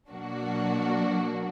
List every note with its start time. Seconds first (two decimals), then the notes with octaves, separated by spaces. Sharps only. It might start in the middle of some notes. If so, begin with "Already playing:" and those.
0.11 B2 F#3 A#3 D4 F#4